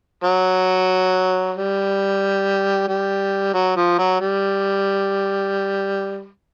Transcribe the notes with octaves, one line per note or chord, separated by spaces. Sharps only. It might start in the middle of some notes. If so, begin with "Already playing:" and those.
F#3
G3
G3
F#3
F3
F#3
G3